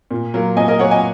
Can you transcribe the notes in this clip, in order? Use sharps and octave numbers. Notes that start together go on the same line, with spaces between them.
A#2
F#3 A#3
A#2 D#5 G#5
A#4 D#5
F#3 A#3 C#5 F#5
D#5 G#5